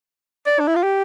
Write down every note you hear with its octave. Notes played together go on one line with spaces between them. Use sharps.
D5
D4
E4
F4
G4